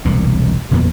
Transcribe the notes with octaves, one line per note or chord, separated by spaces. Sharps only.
E1 C2 A#2
F#1 E2 A#2 B3